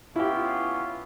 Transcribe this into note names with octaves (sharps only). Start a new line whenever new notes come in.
B3 C#4 E4 F4 G4